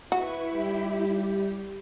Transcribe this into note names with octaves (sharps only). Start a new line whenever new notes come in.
E4 F#4 B4 C#6
G3 G4